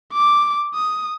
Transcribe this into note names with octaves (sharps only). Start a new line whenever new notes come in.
D6
D#6